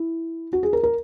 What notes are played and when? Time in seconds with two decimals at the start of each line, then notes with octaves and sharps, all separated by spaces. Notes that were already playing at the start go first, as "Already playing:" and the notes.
Already playing: E4
0.53 F#4
0.63 G#4
0.73 A#4
0.83 A#4